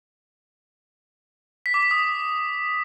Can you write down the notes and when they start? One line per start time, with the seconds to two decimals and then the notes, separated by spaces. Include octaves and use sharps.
1.66 B6
1.74 D6
1.83 B6
1.91 D#6